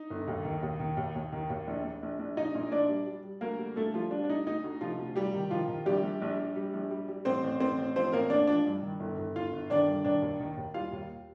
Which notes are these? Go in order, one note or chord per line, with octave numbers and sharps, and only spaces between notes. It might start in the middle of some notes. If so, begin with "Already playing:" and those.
Already playing: D#4
G1
D#2
D#3
D#2
D#3
D#2
D#2
D#3
D#2
A#1
A#1
A#1
A#1
A#1 D#4 D#5
A#2
A#1 D4 D5
G3
G3
G3
D2 A#3 A#4
G3
D2 A3 A4
F3 G3 F4
G3 D4
D4
D2 D#4
D2 D#4
D2
C3 F3 F4
D2
C3 G3 G4
D#3
D#3 F3 F4
D#3
A#1 G3 G4
A#1
A#1
A#1
G3
A#1
G3
G3
A1 C4 C5
A1
A1 C4 C5
A1
F3 C4 C5
A1 A#3 A#4
A1 D4 D5
F3 D4 D5
G2
D#3
G1
G1
G1 F4 F5
G1
D#3 D4 D5
G2
D#3 D4 D5
D#2
D#3
D#2
G3 F4 F5
D#2